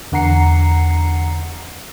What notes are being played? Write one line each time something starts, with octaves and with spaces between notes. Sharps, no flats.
E2 D3 F#5 A#5 C7 C#7